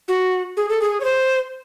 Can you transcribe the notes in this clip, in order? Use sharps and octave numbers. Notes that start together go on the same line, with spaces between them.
F#4
G#4
A4
G#4
C#5
C5